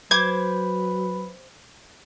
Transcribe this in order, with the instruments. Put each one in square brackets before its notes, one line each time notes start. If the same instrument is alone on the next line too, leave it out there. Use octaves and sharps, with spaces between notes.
[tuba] F#3 [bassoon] B4 [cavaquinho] C5 D6 [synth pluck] G#6